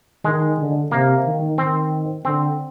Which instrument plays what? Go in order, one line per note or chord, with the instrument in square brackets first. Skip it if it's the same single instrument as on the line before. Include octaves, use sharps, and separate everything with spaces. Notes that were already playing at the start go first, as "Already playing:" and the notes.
[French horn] D#3 [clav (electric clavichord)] G#3
[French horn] D3
[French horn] C3 [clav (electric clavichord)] A#3
[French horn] D#3
[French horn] D#3 [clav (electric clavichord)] C4
[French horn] D3 [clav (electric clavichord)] C4